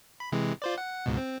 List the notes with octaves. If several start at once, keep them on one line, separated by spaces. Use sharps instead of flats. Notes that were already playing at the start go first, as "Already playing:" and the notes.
B5
C3 E3 G#3
F4 C5 D5
F#5
C#2 G#2 B2
C4